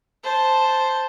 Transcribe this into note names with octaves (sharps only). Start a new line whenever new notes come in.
C5 A5